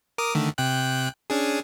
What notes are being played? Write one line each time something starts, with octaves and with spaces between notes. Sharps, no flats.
A#4 D6 D#6
D3 D#3 A3
C3 G5 F#6
C#4 D4 G#4